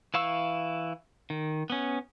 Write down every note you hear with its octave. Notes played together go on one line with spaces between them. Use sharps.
E3 E4 F5 C#6 E6
D#3
B3 C#4